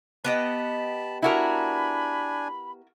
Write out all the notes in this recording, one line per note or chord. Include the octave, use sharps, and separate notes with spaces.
B3 G4 D#5 A5 B5
D4 E4 F#4 A#4 G#5 B5